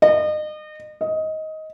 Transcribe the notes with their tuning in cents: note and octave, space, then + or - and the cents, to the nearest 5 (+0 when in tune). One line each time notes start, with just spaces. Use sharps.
D#5 -35
D#5 +15